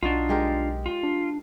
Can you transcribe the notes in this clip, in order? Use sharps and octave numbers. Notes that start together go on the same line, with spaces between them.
B1 D4 D#4 F4 F#4
G#3 G4 A#4
F4
D4